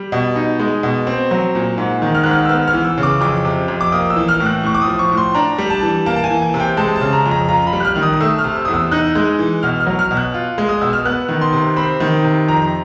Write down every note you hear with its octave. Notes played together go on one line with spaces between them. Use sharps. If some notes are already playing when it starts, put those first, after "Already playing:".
Already playing: G3
B2
D#4
G#3
B2
C4
F#3
A#2
G#2
D#3
F6
G#2 F#6
F6
E6
B3 F6
F6
E3
E6
C#3
D6
F2 D6
C3
F2
D6
A#3 D#6
E6
E3
F6
A2
F#6
A2 C#6
D6
D#6
F3
C#6
A2
C6
D4 A#5
G3
A5
E3
A#3 A5
A5
G#5
E3
G#5
C3
G5
G#3 A5
A5
C#3
A#5
F2
A#5
F4 A#5
B5
G3
F#6
F6
D#3
D#6
D#6
A3 E6
F6
C3
E6
E2 D#6
E6
D#4 F#6
G#3
E3
B2 F6
F6
F#3
F6
B2
F#6
F4
G#3
D#6
B2 E6
F6
B3 F#6
D#3
C6
C3
C4 B5
D#3
C3
F2 A#5